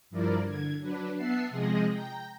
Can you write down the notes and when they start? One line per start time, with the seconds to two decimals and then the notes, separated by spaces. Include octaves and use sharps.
0.10 G2 F3 E4 A#4 D5
0.45 D3 G#6
0.79 F#3 D4 B4
1.16 B3 E5 F#5 A5 C7
1.50 C3 F3 G#3 G#4 D#5 A#6
1.92 G5 A#5